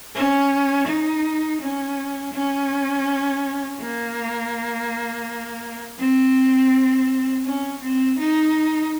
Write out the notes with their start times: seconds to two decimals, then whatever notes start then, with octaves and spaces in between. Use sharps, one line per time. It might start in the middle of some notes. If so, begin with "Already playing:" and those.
0.15 C#4
0.88 D#4
1.62 C#4
2.34 C#4
3.81 A#3
5.99 C4
7.45 C#4
7.83 C4
8.19 D#4